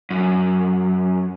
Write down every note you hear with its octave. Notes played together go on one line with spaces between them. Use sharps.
F#2